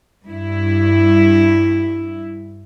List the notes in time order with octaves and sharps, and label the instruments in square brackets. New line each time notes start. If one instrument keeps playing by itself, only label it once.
[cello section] G2 E4